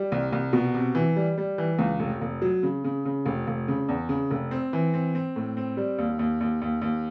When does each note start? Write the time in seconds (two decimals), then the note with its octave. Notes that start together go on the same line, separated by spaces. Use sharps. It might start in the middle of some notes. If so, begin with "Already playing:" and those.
Already playing: G3
0.12 C2
0.32 C2
0.53 B2
0.74 C3
0.95 E3
1.16 G3
1.38 G3
1.58 E3
1.79 C#2
1.99 F1
2.21 F1
2.42 F#3
2.63 C#3
2.84 C#3
3.05 C#3
3.26 F1
3.47 F1
3.68 C#3
3.88 E2
4.09 C#3
4.31 F1
4.51 C4
4.73 E3
4.94 C4
5.15 C4
5.36 A2
5.57 C4
5.77 G3
5.98 D#2
6.19 D#2
6.41 D#2
6.62 D#2
6.82 D#2